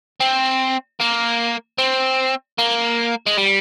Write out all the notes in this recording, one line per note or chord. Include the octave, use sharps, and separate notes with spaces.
C4
A#3
C4
A#3
G#3
G3